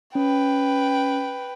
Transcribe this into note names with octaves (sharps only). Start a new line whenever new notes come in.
C#4 B4 G5